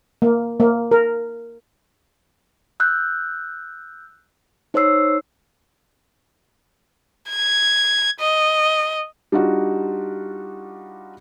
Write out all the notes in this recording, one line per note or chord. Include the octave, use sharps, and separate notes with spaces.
A#3
A#3
A#4
E6 F#6 G6
D#4 C5 C#5 E6 C7
G#6
D#5
G3 D4 D#4 F4 F#4